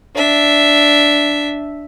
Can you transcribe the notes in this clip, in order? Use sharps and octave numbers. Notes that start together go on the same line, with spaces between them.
D4 E5